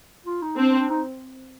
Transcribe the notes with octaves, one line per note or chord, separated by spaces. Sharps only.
F4
D#4
C4 D4
D4
D4
D#4